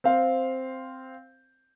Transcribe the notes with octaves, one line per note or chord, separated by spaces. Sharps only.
C4 C5 F5